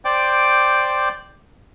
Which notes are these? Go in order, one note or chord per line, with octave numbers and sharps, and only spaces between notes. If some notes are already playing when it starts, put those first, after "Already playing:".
C5 D5 G5 D6